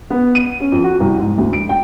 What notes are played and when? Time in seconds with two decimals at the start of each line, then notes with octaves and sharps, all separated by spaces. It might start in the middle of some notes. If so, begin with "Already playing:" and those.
0.10 B3
0.35 D#7
0.60 C#4
0.72 F2
0.84 F#4
1.00 C2
1.19 G#2
1.38 D2
1.53 D7
1.69 G5